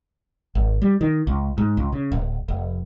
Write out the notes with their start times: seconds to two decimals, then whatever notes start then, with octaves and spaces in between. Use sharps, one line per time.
0.55 G#1
0.82 G3
1.01 D#3
1.27 C#2
1.58 G#2
1.77 C#2
1.92 C#3
2.12 D1
2.48 F1